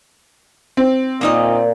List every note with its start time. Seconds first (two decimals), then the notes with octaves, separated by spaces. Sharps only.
0.77 C4
1.21 A#2 A#3 D#4 D#5